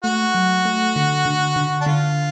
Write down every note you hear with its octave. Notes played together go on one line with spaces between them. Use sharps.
A3 F#4
F#3
A3
D3
D3
D3
D4
D3 F4